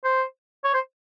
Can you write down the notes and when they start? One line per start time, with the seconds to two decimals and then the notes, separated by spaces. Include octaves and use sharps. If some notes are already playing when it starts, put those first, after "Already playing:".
0.04 C5
0.64 C#5
0.74 C5